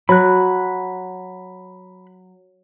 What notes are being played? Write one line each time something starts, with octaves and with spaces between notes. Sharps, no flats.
F#3 B5 F#6